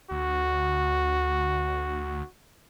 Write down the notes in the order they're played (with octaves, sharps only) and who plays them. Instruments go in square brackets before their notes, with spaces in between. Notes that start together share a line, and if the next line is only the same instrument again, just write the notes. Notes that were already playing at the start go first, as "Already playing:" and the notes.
[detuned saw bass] D2 [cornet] F#4